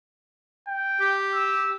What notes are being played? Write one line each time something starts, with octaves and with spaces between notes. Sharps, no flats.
G5
G4
E6